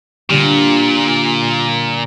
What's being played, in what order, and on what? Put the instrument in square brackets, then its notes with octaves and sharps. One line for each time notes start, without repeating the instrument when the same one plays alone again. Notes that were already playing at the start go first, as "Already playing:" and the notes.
[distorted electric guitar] A#2 [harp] D3 G3